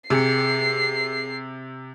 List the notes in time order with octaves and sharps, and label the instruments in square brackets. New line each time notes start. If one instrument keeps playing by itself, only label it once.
[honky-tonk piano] C3 [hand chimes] G#4 G#5 C#7 [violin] C7